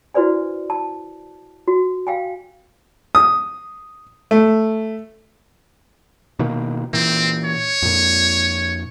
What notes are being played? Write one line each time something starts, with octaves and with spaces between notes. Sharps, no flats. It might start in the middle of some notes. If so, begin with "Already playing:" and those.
E4 F#4 B4 C5 D5 G#5
A5
F#4
F5 G5 G#5
D#6
A3
B2 D#3 A#3
A#2 E3 C4
C#5
F2 A#2